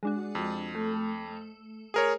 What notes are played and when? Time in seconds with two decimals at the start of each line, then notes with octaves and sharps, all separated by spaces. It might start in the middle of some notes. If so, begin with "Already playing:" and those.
0.03 G#3 D4 F#4
0.35 F2
0.75 A3
1.94 G#4 A#4 C#5